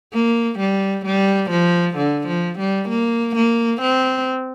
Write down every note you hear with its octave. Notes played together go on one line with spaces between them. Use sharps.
A#3
G3
G3
F3
D3
F3
G3
A#3
A#3
C4